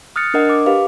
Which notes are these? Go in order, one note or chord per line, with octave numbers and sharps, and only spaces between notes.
D#6 F6 F#6 A6 C#7
D4 A#4 D#5 F#5
D6
G4 B4 F5